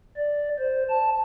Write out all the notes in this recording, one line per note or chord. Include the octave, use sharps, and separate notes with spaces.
D5
C5
A5